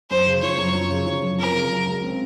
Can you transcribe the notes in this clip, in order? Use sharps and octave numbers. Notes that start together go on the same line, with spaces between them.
F#2 C5
C#3
F3 C#5
F#2
F#2
C#3
F3
F#2
C4 A#4
C#3
F#3
C#2
C4